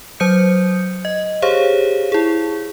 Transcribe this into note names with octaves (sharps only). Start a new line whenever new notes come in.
F#3 C5 D#6 G6 C#7
D#5
G4 G#4 C5 C#5 F5
E4 G#4